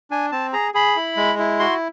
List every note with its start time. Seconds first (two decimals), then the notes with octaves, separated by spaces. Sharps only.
0.11 D4 G#5
0.32 C4 A5
0.53 G#4 A#5
0.74 G#4 B5
0.96 E4
1.17 G#3
1.39 E4
1.59 F#4 C6